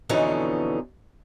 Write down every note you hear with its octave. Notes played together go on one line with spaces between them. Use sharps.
F2 B2 D3 E3 C#4 D#4